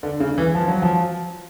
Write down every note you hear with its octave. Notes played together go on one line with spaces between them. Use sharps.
D3
C#3
E3
F3
F#3
F3